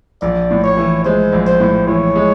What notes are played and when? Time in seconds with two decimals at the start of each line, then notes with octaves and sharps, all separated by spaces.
0.22 A#1 D5
0.51 A2
0.64 C#5
0.77 E3
1.05 G#3 C5
1.33 A#1
1.47 C5
1.60 A2
1.87 E3 C#5
2.16 G#3